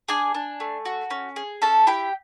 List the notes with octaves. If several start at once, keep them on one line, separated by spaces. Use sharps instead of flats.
D4 G#4 G#5
D4
A3
F#4
C#4
G#4
C#4 A4 A5
E4 G4 G5